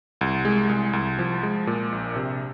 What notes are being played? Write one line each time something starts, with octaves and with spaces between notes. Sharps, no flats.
C2
G#3
C2
C2
F3
G#3
A#2
A#1
C3